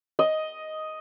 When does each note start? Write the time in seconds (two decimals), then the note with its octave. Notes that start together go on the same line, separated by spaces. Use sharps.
0.19 D#5